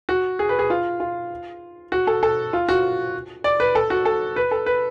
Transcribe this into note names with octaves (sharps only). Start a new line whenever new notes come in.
F#4
G#4
B4
G#4
F4
F4
F#4
A4
A4
F4
F#4
D5
B4
A4
F#4
A4
B4
A4
B4